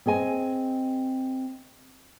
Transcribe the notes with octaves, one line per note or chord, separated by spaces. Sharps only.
C4 G#4 D#5 G#5